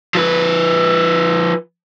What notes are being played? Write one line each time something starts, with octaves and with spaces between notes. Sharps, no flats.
F3 B4